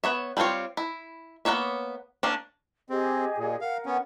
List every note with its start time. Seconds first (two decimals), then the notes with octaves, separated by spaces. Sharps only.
0.04 B3 C#5 E5
0.37 G3 A3 C4 F4 C#5
0.77 E4
1.45 A#3 B3 D#4 C#5 E5
2.23 A#3 C#4 D4
2.90 C4 G4 G#4 D#5
3.38 A#2
3.61 A#4 F5 F#5
3.86 B3 C#4